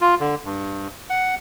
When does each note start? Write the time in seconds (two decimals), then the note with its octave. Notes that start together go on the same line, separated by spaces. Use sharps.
0.01 F4
0.20 D3
0.45 G2
1.10 F#5